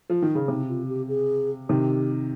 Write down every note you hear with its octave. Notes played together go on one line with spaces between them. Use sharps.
F3
D#3
C#3
C3 D#4
F4
G4
G#4
C3 D#3 G4